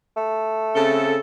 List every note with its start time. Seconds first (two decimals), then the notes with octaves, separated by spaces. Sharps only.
0.17 A3
0.75 C#3 C4 A4